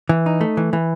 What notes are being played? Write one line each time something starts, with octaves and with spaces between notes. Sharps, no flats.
E3
D#4
A3
E3
E3